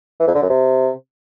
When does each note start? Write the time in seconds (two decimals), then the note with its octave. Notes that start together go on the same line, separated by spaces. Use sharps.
0.20 E3
0.27 F2
0.35 D3
0.42 F#2
0.50 C3